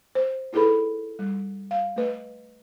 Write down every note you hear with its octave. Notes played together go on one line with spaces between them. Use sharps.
C5
D#4 E4 G#4 A4 B4 B5
G3
F5
A3 B4 D#5